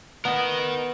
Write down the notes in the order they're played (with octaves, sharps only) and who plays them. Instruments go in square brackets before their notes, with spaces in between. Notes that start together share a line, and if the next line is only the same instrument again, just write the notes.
[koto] B3 [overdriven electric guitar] A#4 D#5